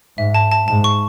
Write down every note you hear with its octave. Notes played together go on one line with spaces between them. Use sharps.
G#2 E5
A5
A5
G#2 A5
C#6